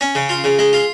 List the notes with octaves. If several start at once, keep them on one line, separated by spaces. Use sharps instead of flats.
C#4
C#3
F4
C#3
G#3
F4